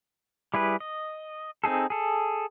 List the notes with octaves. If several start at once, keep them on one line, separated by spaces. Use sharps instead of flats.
G3 E4 G#4 B4
D#5
C4 D#4 G#4 A4
G#4 A4